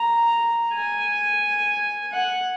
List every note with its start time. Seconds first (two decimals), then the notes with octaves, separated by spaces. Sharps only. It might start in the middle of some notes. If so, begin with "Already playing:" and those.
Already playing: A#5
0.74 G#5
2.13 F#5